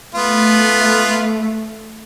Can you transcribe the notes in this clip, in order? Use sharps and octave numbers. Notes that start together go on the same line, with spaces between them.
A3 B3 F4